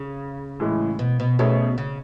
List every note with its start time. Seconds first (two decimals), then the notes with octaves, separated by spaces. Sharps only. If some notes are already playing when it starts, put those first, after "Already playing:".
Already playing: C#3
0.60 A2 E3 G#3
0.99 B2
1.20 B2
1.39 B2 A3 C#4 G#4 C#5 E5
1.78 C#3